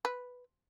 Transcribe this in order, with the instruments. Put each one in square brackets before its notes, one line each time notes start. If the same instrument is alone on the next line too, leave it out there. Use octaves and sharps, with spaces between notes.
[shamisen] B4